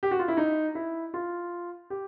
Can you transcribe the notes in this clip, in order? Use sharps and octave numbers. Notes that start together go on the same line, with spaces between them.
G4
F#4
F4
E4
D#4
E4
F4
G4